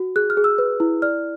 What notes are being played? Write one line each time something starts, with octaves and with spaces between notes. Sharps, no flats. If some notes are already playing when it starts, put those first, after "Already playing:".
Already playing: F#4
G#4 F#6
F6
G#4
E6
B4
E4
D5 F6